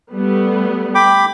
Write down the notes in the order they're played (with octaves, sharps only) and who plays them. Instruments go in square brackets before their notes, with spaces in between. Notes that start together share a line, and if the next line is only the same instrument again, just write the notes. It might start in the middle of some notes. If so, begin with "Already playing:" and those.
[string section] G3 A3 B3
[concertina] G5 B5 D6